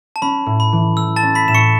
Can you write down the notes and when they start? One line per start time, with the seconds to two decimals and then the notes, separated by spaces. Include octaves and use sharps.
0.16 A5
0.22 C#4 B5
0.46 A2
0.60 B5
0.72 E3
0.97 A3 E6
1.16 A5 A6
1.23 C#4
1.35 B5 B6
1.48 A2 E7
1.55 C#6 C#7